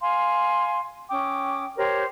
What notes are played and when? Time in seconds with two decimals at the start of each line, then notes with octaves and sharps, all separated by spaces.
0.01 F5 G#5 C6
1.09 C#4 G5 D6 D#6
1.77 G4 A#4 C5 C#5